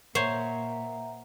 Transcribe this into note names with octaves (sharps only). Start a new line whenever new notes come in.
A#2 C5 C#5 E5 F#5 A#5